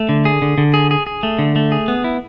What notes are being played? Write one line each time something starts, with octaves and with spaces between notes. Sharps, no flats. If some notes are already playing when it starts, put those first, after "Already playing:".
Already playing: A3
D3
G#4
D3
D3
G#4
G#4
G#4
A3
D3
A3
G#4
B3
E4